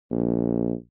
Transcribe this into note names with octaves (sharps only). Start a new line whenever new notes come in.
A#1